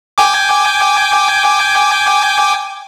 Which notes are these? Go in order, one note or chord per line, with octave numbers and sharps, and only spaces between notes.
G5 G#5 D6